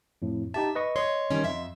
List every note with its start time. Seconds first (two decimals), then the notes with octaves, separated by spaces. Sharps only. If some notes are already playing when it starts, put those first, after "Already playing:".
0.22 F2 A2
0.54 D#4 G4 E5 A5
0.75 B4 D#5 C#6
0.96 C#5 D#5 C6
1.31 D#3 G3 C#4
1.44 F2 E5